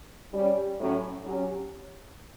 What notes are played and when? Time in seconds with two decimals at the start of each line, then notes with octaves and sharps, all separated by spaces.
0.32 G3 C#4 G4
0.79 A2 F#3 C#4
1.25 F#3 C#4 G4